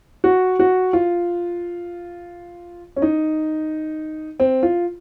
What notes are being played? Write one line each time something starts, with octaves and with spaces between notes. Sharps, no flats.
F#4
F#4
F4
C#4
D#4
C4
F4